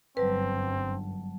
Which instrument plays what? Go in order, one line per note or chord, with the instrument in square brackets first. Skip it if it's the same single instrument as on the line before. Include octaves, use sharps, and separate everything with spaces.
[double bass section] G1 F#2 [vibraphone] F#3 G3 A5 [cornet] C4 [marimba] B4